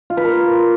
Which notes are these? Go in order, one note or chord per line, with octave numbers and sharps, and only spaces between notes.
F4
B4
A#4